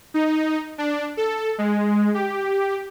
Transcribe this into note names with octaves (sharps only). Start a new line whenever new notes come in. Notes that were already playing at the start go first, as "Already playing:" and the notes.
D#4
D4
A4
G#3
G4